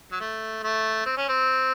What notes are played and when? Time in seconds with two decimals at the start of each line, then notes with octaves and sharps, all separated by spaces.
0.12 F#3
0.20 A3
0.63 A3
1.06 C4
1.17 C#4
1.29 C4